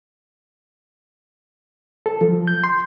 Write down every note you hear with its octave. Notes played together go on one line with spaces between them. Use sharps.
A4
F3
G6
C6